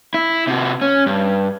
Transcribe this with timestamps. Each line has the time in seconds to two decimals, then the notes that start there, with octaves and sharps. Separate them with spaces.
0.14 E4
0.47 C3 F#4
0.82 C#4
1.06 G2